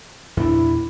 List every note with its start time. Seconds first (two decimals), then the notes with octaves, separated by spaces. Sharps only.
0.37 E2 A#2 D4 E4